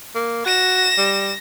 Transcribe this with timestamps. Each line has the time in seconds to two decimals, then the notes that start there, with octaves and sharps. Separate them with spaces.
0.15 A#3
0.46 F#4 A#6 E7
0.98 G3